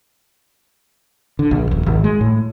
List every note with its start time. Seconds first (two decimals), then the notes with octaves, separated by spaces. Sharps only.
1.39 D3
1.51 A#1
1.71 D#1
1.86 G#1
2.04 G#3
2.21 A2